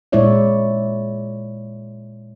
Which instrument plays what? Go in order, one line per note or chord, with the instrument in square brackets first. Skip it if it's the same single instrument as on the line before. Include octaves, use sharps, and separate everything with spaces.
[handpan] A#2 G#3 E4 C#5 D5 E5